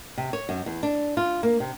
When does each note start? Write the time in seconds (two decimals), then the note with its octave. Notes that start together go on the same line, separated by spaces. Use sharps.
0.18 C3
0.33 C#5
0.49 F#2
0.66 E2
0.83 D4
1.17 F4
1.43 A#3
1.60 C3